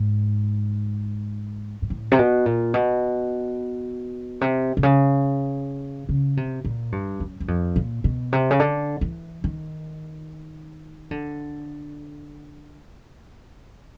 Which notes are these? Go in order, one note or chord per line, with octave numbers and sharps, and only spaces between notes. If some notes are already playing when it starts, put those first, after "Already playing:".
Already playing: G#2
G#2
A2
C3
B2
A#2
B2
C3
C3
C#3
C#3
C3
A#2
G2
F#2
F#2
F2
A#2
B2
C3
C#3
D3
E3
D#3
D3